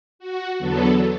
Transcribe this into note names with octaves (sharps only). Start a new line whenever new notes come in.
F#4
E2 D3 F#3 B3 A4